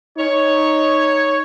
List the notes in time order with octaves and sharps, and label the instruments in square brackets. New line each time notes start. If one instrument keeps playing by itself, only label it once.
[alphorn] D#4 [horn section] C#5